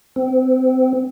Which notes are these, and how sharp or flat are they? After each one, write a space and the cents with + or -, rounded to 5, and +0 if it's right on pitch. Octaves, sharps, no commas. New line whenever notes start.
C4 -25